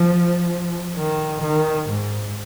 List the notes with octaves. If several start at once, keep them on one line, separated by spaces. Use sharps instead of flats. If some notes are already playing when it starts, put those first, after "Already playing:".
Already playing: F3
D#3
D#3
G#2